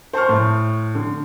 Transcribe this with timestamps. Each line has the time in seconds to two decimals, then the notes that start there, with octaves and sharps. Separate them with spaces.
0.13 C5 A5 C6 C#6 F6
0.29 A2
0.95 D3